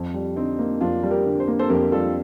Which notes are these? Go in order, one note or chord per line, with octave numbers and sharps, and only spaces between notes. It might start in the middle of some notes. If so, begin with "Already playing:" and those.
Already playing: F2
G3
D3 C4 D#4
A#3
F2 D4 F4
G3
G4 A#4
D3
C5
A#3
A4 C5
F2 G4 A#4
G3 F4 A4